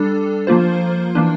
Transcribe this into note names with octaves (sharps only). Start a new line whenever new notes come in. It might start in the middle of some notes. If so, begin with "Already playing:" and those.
Already playing: G3 D4 A4
F3 A#3 F4 C5
E3 A#3 D4